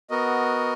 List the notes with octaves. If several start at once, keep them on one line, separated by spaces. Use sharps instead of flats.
B3 F#4 A#4 D#5